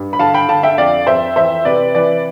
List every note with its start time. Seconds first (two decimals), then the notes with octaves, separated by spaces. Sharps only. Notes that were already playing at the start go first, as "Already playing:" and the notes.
Already playing: G2
0.13 B5
0.19 D3 F5 A5
0.34 G5 B5
0.49 D3 F5 A5
0.63 E5 G5
0.78 F2 D5 F5
1.07 F2 C5 E5
1.36 E3 C5 E5
1.65 C3 B4 D5
1.95 E3 B4 D5